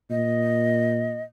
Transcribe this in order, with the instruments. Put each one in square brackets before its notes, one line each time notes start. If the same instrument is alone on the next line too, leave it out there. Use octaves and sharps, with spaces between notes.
[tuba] A#2 [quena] D#5